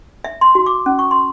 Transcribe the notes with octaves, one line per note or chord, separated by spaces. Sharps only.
E5
C6
F#4
D6
C#4
C#6
C6